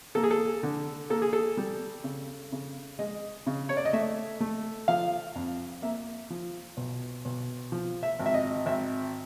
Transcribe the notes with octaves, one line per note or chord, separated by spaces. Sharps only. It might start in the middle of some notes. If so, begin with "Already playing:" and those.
A#3 A4
G#4
A4
D3
A#3 A4
G#4
A4
G3
C#3
C#3
G#3 D#5
C#3
C#5
D5
D#5
A3 E5
A3
F3 F5
F2
A#3 E5
F3
B1
B1
F3
E5
G#1
E5
D#5
G#1 E5